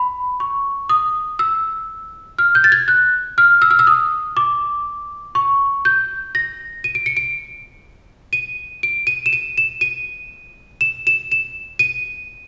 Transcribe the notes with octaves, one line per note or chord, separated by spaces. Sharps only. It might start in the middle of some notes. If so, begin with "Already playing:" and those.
Already playing: B5
C#6
D#6
E6
F6
G6
A6
G#6
F#6
F6
E6
F6
E6
D#6
D6
C#6
G6
A#6
D#7
D7
C#7
D7
D#7
D7
D#7
E7
D#7
E7
D#7
E7
E7
E7
D#7